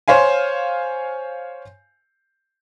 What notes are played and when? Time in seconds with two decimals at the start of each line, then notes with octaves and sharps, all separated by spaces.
0.08 C5 C#5 F5 G#5